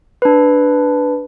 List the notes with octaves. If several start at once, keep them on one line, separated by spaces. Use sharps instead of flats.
D4 B4